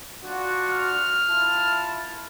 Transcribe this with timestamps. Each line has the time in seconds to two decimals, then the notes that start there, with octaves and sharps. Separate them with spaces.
0.24 D4 F4 F#4
0.70 F6
1.28 E4 F4 A5